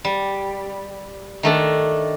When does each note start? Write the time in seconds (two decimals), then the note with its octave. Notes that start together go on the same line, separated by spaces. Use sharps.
0.05 G3
1.43 D#3 A3 D4